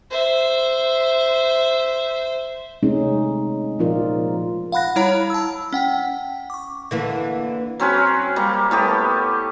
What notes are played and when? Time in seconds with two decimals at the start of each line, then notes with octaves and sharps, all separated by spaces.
0.11 C5 E5
2.83 C3 G#3 A3 C#4 D#4
3.79 A#2 F3 D#4 F4 A#4 D5
4.72 F5 F#5 B5 F#6 A#6
4.96 G3 E4 C#5 A#5 B5
5.30 A5 E6
5.72 C#4 F#5 G5
6.50 C#6 D6
6.91 D3 E3 A#3
7.80 F#3 C4 C#4 B4
8.36 G3 A#3
8.71 A2 B3 G4